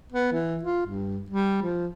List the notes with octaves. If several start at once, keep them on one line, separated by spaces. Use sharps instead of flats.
B3
E3
F4
G2
G3
F3